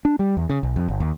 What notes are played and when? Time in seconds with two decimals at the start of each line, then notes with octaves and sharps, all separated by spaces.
0.05 D4
0.19 G3
0.37 E2
0.50 C#3
0.63 B1
0.76 F2
0.88 G1
1.00 D#2